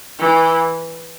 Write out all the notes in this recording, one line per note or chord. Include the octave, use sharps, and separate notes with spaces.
E3